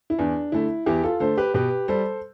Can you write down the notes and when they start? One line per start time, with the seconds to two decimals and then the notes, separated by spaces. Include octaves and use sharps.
0.10 E4
0.18 E2 D4
0.52 D3 A3 E4
0.86 E2 E4 G4
1.03 F4 A4
1.20 D3 A3 A4 C5
1.37 G4 B4
1.54 B2 G4 B4
1.88 G3 A4 C5